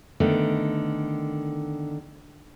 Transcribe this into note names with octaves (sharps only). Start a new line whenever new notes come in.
D3 D#3 A3 B3